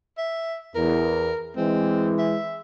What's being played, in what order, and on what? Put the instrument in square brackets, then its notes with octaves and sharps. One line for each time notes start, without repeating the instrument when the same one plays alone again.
[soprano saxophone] E5
[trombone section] E2 [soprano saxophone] A#4
[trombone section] E3 G#3 [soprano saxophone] C4
[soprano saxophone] E5